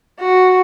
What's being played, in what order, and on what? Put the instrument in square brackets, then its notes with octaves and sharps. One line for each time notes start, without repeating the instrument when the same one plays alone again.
[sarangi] F#4